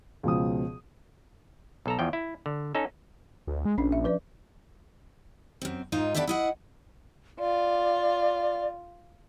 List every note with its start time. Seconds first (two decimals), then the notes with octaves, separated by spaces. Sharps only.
0.23 C#2 B2 F3 D#6
1.86 B1 A4 A#5
1.99 E2 F3 G5
2.13 E4
2.46 D3
2.75 C#4 D#4 A4
3.47 D2
3.65 G#3
3.78 A#1 C#4 D4
3.92 E5
4.04 F3 B4 D5
5.62 F#2 C4
5.92 G#2 D#4 F4
6.15 B3 D4 G4 A4 C5 E5
6.27 E4 D#5 F#5
7.40 F4 D5